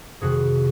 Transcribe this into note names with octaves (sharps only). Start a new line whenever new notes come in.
F1 F2 C3 D#3 F#4 G#4